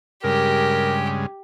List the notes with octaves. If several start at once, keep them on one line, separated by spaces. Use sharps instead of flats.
G2 C#3 G#3 G4 A#4